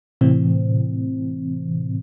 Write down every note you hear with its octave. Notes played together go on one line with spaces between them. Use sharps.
A2 C3 E3 C4